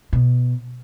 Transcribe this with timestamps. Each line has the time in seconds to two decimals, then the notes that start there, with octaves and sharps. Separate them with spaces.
0.13 B2